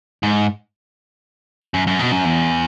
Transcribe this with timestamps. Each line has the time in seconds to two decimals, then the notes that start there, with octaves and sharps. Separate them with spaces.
0.23 G#2
1.74 F#2
1.87 F#2
1.99 B2
2.12 F#2
2.25 E2